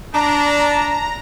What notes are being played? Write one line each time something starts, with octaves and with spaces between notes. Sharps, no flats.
D4 A#5